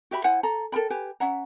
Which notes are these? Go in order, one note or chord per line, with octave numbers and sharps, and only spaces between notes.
F#4 G4 E5 B5
E4 C5 F#5 G#5
A4 A#5
A4 A#4 G5 B5
G4 B4 G#5
C#4 E5 F#5 A#5